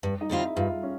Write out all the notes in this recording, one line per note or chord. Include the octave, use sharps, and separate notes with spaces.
G2
D#4 D#5
D3 G3 C4 F4
E4 E5
G2 F4 F5
C#4